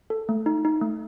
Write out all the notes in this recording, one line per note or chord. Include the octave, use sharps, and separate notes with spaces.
A4
A3
D#4
D#4
A3